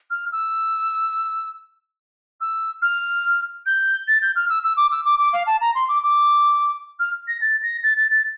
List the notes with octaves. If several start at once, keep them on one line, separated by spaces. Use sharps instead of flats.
F6
E6
E6
F6
G6
A6
G6
F6
E6
E6
D6
E6
D6
D6
F5
A5
A#5
C6
D6
D6
F6
A#6
A6
A#6
A6
A6
A6